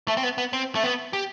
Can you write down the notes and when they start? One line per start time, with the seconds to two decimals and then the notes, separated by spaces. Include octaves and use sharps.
0.08 A3
0.17 C4
0.23 B3
0.38 B3
0.53 C4
0.75 A3
0.83 B3
1.13 G4